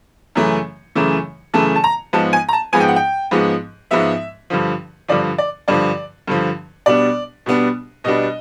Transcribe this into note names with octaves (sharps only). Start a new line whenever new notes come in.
F#2 C#3 E3 A3
F#2 C#3 E3 A3
F#2 C#3 E3 A3 A5
A5
A#5
G#2 F3 G#3 B3 A5
G#5
A#5
A5
G#2 F3 G#3 B3 G#5
G5
F#5
G5
G#2 F3 G#3 B3
G#2 F3 G#3 B3 E5
G2 D3 F3
G2 D3 F3 D5
D5
G2 D3 F3 D5
G2 D3 F3
B2 G3 B3 D4 D5
B2 G3 B3 D4
B2 G3 B3 D4 D#5